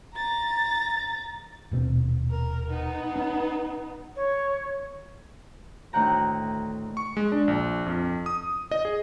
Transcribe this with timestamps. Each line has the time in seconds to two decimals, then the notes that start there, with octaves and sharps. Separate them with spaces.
0.13 A#5 A6
1.72 D#1 B2 C4
2.31 A#4
2.70 B3 D#4
3.16 C#4
4.16 C#5
5.93 D2 A2 D#3 F#5 G5 A#5
6.97 C#6
7.17 G#3
7.32 D4
7.48 A#1
7.86 F2
8.26 D#6
8.71 D#5
8.85 G#4